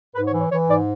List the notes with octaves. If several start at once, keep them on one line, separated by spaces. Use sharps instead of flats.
G#2 B4
C#5
E3
C#5
E3 C#5
G#2 D5